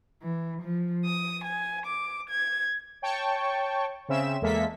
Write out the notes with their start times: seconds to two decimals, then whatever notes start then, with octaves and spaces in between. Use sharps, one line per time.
0.22 E3
0.63 F3
1.06 D#6
1.44 G#5
1.86 D6
2.29 G#6
3.02 C#5 G5 A5 C#6
4.09 C#3 C4 C#4 E5 E7
4.42 E2 G#3 A#3 A4 E5 B6